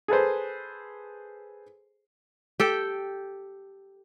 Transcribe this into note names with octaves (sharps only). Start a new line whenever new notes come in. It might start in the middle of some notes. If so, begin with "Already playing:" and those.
G#4 A4 B4 C5
G4 A4 G5